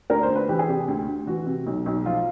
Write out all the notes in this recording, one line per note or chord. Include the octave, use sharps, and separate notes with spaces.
D2 A#4
C5
D2
B4
E3 G4
G#4
C3 G4
D2
D2
E3 F#4
C3
B1
B1
F3 F4